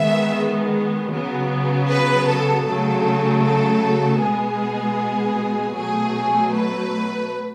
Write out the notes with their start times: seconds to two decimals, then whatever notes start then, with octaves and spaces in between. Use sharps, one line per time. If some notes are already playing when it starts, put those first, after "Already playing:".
Already playing: D#3 G#3 B3 E5
1.11 C#3 F#3 B3
1.89 B4
2.27 A4
2.65 C#3 F#3 A3 A4
3.43 A4
4.20 B2 G#3 B3 G#4
5.76 B2 F#3 A3 G#4
6.52 B4